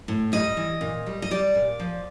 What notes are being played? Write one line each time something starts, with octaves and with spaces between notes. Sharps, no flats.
A2
G3 D#5
E3
A#2
G3
D#5
G3 D5
A#2
F3